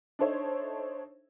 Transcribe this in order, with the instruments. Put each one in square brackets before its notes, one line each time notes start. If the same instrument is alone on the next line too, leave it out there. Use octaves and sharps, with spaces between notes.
[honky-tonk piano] D4 D#4 A4 C5 C#5 E5